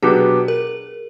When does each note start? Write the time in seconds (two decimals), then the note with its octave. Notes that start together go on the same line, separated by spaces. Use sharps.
0.03 B2 F#3 B3 D4 G4 G#4
0.48 A#4